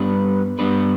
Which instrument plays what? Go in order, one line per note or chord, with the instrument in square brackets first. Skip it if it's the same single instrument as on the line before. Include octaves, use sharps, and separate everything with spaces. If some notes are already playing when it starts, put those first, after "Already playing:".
Already playing: [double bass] G2 [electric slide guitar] G3 B3 D4 B4
[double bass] G2 [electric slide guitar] G3 B3 D4 B4